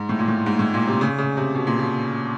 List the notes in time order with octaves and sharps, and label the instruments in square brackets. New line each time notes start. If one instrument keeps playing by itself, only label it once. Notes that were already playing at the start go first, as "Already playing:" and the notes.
Already playing: [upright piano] G#2
A2
A#2
A2
G#2
A2
A#2
C3
C#3
C#3
C3
B2
A#2
B2